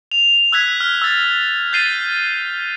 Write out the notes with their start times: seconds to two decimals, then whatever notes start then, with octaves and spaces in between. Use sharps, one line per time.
0.11 F7
0.52 E6 F#6 G#6 B6
0.80 F6
1.02 E6 A6
1.73 G6 A6 C7 D#7 G7